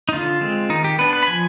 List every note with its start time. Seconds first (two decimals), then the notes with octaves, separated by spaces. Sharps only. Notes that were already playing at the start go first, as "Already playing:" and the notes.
0.09 D#4
0.13 D3 F4
0.41 G#3 C4
0.70 D#3 D#4
0.84 G4
0.98 B3 D4 B4
1.13 B4
1.23 B5
1.27 F3 G#5